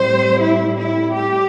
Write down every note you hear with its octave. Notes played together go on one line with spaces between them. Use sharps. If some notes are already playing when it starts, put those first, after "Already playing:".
Already playing: A2 G3 C4 C5
E4
E4
G4